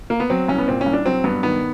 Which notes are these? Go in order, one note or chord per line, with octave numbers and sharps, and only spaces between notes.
A#3
B3
F#3 C4
C2 C#4
B3
A#2 C4
C#4
C2
D4
F#3 C4
G2 B3
D#3 B3